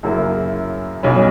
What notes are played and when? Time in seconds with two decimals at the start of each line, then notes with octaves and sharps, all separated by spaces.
0.03 F#2 C#3 F#3 A#3 E4
1.03 B1 B2 G3 C#4